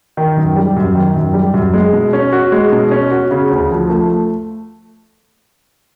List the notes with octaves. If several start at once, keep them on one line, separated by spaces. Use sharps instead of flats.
D#3
F#2
G3
F#2
D#3
F#2
G3
F#2
G#3
B2
C#4
F#4
G#3
B2
C#4
F#4
C#3
D2
F3
A3